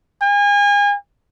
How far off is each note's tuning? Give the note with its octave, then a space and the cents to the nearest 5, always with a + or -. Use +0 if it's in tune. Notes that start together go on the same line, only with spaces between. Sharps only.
G#5 -35